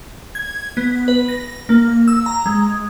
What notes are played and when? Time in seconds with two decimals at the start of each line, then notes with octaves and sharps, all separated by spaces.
0.35 G#6
0.77 B3
1.08 B4
1.29 A#6
1.69 A#3
2.08 E6
2.26 A#5
2.46 G#3